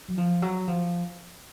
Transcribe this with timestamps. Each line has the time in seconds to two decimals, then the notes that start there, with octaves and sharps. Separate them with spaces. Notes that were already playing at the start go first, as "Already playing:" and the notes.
0.08 F#3
0.18 F3
0.42 F#3
0.68 F3